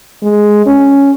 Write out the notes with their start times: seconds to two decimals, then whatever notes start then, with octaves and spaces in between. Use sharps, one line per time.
0.22 G#3
0.66 C#4